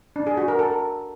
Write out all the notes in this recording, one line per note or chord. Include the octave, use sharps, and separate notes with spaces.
D4
G#4
F#4
A#4
A4